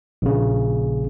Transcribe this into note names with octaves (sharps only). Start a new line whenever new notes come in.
A#1 C#3